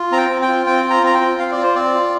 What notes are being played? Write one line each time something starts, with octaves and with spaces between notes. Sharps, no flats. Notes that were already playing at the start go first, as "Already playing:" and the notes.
Already playing: F4
C4 A#5
G5
C4
G5
F4
C4 G5
F4
A#5
C4 A#5
G5
F4
C4 F5
D5
F4
C5
C4 D5
F4